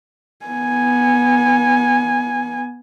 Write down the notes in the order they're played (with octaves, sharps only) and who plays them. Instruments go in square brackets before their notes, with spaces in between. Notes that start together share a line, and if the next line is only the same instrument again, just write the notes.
[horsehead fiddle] B3 G#5